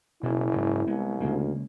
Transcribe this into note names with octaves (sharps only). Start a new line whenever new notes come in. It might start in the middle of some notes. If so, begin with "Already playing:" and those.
F#1 B2 E4
G#2 C#3
C2 G#3 B3
D2 C#3 G#3 A#3